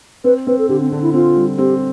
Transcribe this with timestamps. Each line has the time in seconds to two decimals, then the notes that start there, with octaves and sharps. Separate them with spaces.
0.24 C4 B4
0.47 C4 B4
0.59 A4
0.69 D3 G4
0.80 C4
0.91 D3 D4
1.02 E4
1.14 C4 F4
1.36 G3
1.58 C4 G4